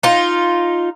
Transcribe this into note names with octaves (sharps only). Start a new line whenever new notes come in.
D#4 F4